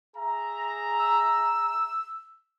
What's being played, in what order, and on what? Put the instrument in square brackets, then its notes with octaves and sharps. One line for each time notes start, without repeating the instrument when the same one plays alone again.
[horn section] G#4 E5 A#5
[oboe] E6